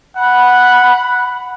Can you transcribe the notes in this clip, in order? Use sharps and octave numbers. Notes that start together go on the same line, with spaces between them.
F#5 B5